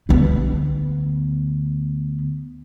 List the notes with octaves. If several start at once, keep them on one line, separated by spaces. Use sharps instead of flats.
D2 B3